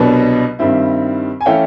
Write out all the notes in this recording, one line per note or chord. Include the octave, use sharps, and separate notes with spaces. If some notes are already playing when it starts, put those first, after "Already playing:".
Already playing: C2 B2 F#3 B3 D4
G2 D#3 G3 C4 E4
G#5
E3 A3 C#4 E4 F5 G5